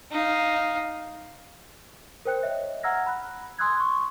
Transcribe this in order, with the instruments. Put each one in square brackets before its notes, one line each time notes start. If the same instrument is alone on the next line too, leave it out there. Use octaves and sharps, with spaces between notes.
[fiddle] D#4 F5
[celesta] A#4 C5 G5 F#6 C#7
C#5 D#5 E5
F#5 A#5 E6 F6 G#6 A#6
B5 F#6
G#5 C6 D#6 E6 F#6 G#6
C6 C#6